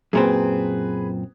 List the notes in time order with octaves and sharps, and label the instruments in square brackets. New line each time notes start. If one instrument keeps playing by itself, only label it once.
[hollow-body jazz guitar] F#2 A#2 C4 [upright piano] G#4 B4